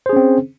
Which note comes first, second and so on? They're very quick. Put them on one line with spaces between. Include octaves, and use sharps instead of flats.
C5 G#4 C#4 C4